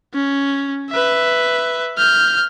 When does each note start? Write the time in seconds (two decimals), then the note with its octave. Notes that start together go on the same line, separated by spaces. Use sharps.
0.14 C#4
0.91 B4 E5
1.98 F6 G6